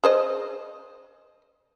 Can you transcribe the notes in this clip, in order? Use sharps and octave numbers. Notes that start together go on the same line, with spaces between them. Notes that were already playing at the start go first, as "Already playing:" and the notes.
G#4 C5 D#5